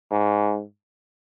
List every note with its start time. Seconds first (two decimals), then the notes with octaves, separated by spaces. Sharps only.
0.11 G#2